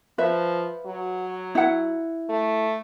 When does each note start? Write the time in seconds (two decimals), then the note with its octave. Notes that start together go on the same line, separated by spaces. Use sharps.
0.18 F3 B4 E5
0.86 F#3
1.55 E4 F#5
2.29 A3